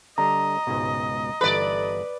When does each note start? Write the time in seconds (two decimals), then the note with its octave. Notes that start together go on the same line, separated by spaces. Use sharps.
0.18 D3 G3 D4 D#5 A#5
0.67 C#2 G#2 B2
1.41 G1 E3 A4 B4 D5